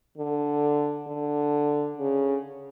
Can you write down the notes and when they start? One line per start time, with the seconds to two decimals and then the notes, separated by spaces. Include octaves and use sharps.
0.18 D3
1.07 D3
1.98 C#3